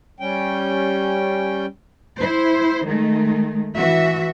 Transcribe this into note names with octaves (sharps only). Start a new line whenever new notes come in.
G3 C#4 G5
E4 C5
D#3 G#3 A3
E3 F#4 E5